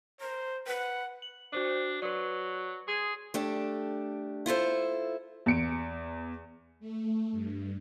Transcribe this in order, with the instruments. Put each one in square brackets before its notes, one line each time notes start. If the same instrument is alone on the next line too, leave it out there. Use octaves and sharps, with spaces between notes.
[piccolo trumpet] C5 [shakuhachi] A#5
[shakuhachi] B4 [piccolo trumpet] F#5
[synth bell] F#7
[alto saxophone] D4 [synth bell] F#4 C5 D5
[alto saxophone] F#3 [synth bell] B4 D5
[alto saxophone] G#4 [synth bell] C6 D#6 G#6
[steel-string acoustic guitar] A3 D4 G4
E4 F4 A4 C5
[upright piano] E2 C#7 D7
[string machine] A3
G2